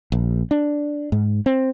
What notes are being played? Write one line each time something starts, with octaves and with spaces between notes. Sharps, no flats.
A#1
D4
G#2
C4